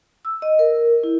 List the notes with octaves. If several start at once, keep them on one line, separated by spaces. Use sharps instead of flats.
E6
D#5
A#4
E4